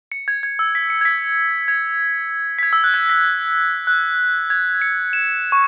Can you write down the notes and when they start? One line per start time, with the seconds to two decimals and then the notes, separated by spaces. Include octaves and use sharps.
0.12 C#7
0.28 G#6
0.43 G#6
0.59 E6
0.75 B6
0.90 C#7
1.01 G#6
1.05 B6
1.68 G#6
2.59 B6
2.63 G#6
2.73 E6
2.84 F#6
2.94 G#6
3.10 B6
3.87 F#6
4.50 G#6
4.82 C#7
5.13 E7
5.52 C#6